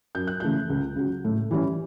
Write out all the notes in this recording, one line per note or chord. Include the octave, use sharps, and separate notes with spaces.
F#2 G6
F#6
C#3 E3 A3 G6
C#2
C#3 F#3
A2
E3 G3 C#4